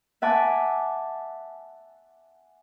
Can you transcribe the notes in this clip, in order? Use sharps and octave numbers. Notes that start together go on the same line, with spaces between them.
E5 F#5 G#5 A5 D6